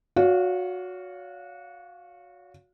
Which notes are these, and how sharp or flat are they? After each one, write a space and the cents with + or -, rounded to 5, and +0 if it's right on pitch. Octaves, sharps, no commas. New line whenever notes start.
F#4 -20 C#5 +35 F5 +0